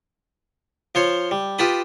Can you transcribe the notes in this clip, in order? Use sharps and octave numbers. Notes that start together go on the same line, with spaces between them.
F3 F4 C5 C#5
G3
F4 G4 B4 A5 B5 D#6